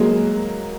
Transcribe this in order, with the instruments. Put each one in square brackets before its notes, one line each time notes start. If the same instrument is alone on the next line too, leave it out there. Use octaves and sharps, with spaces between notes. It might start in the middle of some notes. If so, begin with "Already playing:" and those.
Already playing: [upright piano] F#3 G#3 A#3